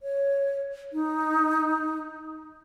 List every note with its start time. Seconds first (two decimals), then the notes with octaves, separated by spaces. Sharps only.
0.02 C#5
0.93 D#4